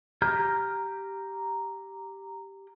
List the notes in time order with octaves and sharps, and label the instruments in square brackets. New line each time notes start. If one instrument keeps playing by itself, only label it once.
[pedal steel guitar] G4 A#5 F6 G6